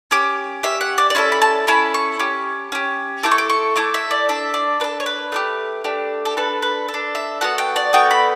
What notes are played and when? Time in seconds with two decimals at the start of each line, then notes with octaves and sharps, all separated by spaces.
0.11 C#4 G4 D6
0.63 C#4 G4 E5
0.81 F#5
0.98 D5
1.10 D5
1.15 C#4 E4 A4 E5
1.32 B5
1.42 A5
1.67 C#4 E4 A4 B5
1.94 C#6
2.19 C#4 G4
2.72 C#4 G4
3.23 A3 E4 A4 D6
3.31 C#6
3.38 D6
3.50 C#6
3.76 A3 E4 A4 D6
3.94 E5
4.11 D5
4.29 D4 A4 E5
4.54 D5
4.80 D4 B4
4.84 A4
5.00 C#5
5.06 B4
5.32 A3 D4 G4
5.84 A3 D4 G4
6.25 A4
6.37 D4 A4 B4
6.62 B4
6.88 A4
6.94 D4
7.15 E5
7.41 B3 F#4 A4 F#5
7.58 G5
7.76 D5
7.93 B3 F#4 A4 G5
8.11 B5